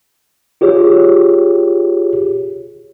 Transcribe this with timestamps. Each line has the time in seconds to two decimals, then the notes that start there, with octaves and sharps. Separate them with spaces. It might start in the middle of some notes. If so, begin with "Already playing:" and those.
0.61 F4 G4 G#4 C#5